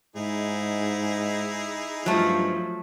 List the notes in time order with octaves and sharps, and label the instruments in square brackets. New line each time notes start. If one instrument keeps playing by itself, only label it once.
[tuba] G#2 [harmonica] D#4 E4 G#4
[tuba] G2 [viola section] F3 [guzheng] F#3 A3